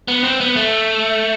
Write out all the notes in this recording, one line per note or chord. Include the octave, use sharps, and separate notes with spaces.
B3
C4
B3
A3